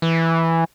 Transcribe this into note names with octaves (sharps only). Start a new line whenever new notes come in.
E3